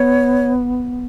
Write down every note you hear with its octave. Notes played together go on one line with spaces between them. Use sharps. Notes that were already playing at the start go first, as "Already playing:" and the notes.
Already playing: B3 C#5